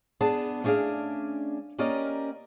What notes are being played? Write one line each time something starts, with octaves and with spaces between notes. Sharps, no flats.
B3 D4 G#4 A5
A3 C#4 D4 G#4 D5 F5
A#3 C#4 G4 A#4 D5 D#5